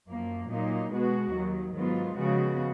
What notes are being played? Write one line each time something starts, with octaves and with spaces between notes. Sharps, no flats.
F#2 F3 A#3
A#2 F#3 A#3 D#4
B2 G#3 B3 F#4
D#2 D#3 F#3
G#2 D#3 F#3 B3 F4
C#3 F3 G#3 B3 F#4